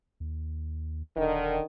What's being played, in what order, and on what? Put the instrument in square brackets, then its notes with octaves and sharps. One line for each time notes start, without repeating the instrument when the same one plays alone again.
[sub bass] D#2
[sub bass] D#1 [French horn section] D3 D#3